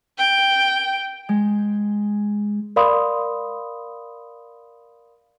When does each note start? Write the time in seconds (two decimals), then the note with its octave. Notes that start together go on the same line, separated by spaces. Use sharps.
0.18 G5
1.29 G#3
2.76 A#4 D5 F5 B5 C6 D#6